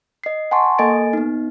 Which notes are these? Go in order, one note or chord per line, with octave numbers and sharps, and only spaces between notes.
D#5 C7
F#5 G#5 A5 C6 C#6
A#3 A4 D#5 G#5 A6 D7
B3 D#4